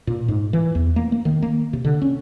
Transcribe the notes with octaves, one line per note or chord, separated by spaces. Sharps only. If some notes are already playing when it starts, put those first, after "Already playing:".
A#2
G#2
E3
E2
A#3
A#3
D#3
A#3
C3
D3
C#4